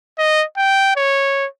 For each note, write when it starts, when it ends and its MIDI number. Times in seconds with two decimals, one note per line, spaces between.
0.19 0.44 75
0.57 0.95 79
0.96 1.46 73